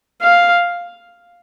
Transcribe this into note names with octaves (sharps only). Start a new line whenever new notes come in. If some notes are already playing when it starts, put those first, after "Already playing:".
F5